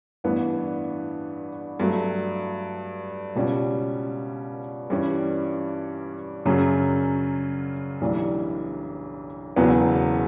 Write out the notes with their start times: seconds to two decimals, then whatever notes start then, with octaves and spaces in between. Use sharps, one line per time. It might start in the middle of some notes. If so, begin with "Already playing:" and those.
0.24 A1 G2 E3 B3 D4
1.80 G2 F#3 A3
3.35 C#2 B2 G3 C#4
4.90 G2 E3 G3 C#4
6.45 F#2 C#3 F#3 C#4
8.01 B1 A2 E3 G3 D4
9.56 E1 E2 C#3 F#3 B3